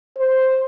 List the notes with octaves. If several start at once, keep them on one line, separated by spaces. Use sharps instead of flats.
C5